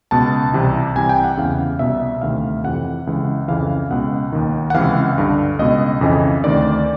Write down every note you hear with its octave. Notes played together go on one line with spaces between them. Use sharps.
C#2 B2 A5
C2 C3 E3
C2 C3 E3 G#5
G5
F#5
E2 C#3 E3 F5
C2 B2 E5
D2 C3 D#3 F5
F2 C3 E3 F#5
C#2 C#3 E3
F2 C#3 E3 F5
C#2 B2 F#5
D#2 D#3
F#5
C#2 C3 E3 F5
G2 D3
C#2 B2 D#5
F2 C#3 E3
D2 C3 D#3 D5